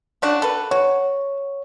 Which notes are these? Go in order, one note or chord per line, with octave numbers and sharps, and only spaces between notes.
C#3 D4 F#4
A4 B4
F#4 C#5